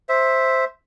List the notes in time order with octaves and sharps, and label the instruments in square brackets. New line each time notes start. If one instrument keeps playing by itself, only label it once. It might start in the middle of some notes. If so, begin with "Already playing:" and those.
[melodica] C5 E5